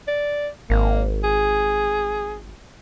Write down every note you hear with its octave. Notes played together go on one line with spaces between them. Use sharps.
D5
G#1 A#3
G#4